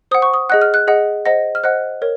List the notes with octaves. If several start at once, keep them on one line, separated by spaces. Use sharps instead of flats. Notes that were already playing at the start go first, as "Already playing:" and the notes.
C5 F#5 D#6
C#6
D#6
G#4 D#5 F#5 F#6
F6
F#6
G#4 D#5 F#5
C5 D#5 F#5 A#6
F6
C5 D#5 F#5 F#6
A#4 C#5